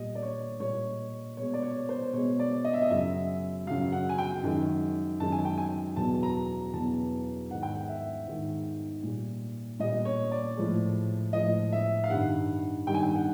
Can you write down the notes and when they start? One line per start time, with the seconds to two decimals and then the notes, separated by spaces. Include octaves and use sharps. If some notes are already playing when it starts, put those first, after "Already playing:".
Already playing: A#2 G3 D#5
0.15 D5
0.23 C#5
0.60 A#2 G3 C#5
1.37 B2 G#3 C#5
1.54 D5
1.62 C#5
1.89 C5
2.13 B2 G#3 C#5
2.39 D5
2.65 D#5
2.73 E5
2.82 D#5
2.90 F#2 C#3 F#3 E5
3.67 F#2 C#3 F#3 F5
3.92 F#5
4.09 G#5
4.18 G5
4.43 F#2 D#3 G#3
5.20 F#2 D#3 G#3 A5
5.32 G#5
5.45 G5
5.58 G#5
5.96 E2 B2 F#3 A5
6.23 A#5
6.73 E2 B2 F#3 A5
7.50 G#2 D#3 G#3 F#5
7.63 G5
7.75 F#5
7.89 E5
8.27 G#2 D#3 G#3
9.03 A#2 G3
9.80 A#2 G3 D#5
10.05 C#5
10.32 D5
10.57 A2 F3 G#3
11.33 A2 F3 G#3 D#5
11.72 E5
12.04 F5
12.10 G2 D#3 G3 F#5
12.87 G2 D#3 G3 G5
12.94 G#5
13.03 G5
13.16 F#5